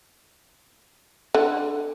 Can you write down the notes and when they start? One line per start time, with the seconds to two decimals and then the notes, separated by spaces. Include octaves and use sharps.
1.35 D3